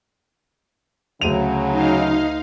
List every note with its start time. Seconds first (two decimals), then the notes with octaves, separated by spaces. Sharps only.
1.21 D2 C#3 F#3 D#7 F7
1.71 D#4 F5